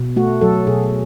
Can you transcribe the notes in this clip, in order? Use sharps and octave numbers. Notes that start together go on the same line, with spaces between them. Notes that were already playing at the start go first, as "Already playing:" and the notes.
Already playing: B2
A3 F#4
F#3 A4
B2 G#4